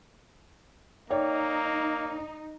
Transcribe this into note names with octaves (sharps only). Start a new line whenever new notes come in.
A#3 D#4 C#5 D5 G5